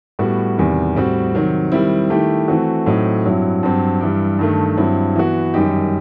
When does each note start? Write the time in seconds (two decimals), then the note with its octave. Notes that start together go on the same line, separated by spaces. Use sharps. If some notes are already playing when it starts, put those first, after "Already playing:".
0.19 A2 G3 B3 F#4
0.57 E2 C3 D#3 G3
0.95 A2 G3 C4 F#4
1.33 C3 D#3 F#3 C4
1.72 D#3 G3 C4 E4
2.10 D#3 A3 E4 G4
2.48 E3 A3 C4 F#4
2.86 A2 F#3 C4 D#4
3.24 G2 F#3 C4 E4
3.63 G2 F#3 C4
4.01 G2 E3 G3
4.39 G2 D#3 A3
4.77 G2 F#3 C4 E4
5.16 E3 B3 F#4
5.54 F#2 D#3 G3 D#4 G4